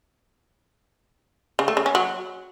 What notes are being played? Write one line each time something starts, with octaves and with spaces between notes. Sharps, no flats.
C#3
A3
C#3
C#4
F#3